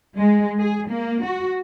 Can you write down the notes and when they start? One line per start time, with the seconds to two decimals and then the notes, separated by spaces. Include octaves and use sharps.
0.19 G#3
0.59 G#4
0.90 A#3
1.25 F#4